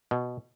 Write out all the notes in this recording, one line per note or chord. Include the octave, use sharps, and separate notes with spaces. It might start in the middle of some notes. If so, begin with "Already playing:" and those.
B2